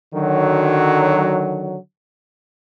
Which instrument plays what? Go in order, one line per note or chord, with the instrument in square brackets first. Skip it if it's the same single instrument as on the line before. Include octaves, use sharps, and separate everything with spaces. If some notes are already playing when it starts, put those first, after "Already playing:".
[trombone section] D3 D#3 F#3